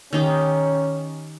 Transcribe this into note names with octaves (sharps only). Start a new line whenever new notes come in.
D#3 C#4 D#4 G4